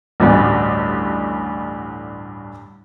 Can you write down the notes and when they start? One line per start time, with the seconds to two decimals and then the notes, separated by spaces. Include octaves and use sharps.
0.20 A1 D2 G2